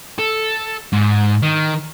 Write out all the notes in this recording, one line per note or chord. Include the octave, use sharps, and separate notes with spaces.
A4
G#2
D#3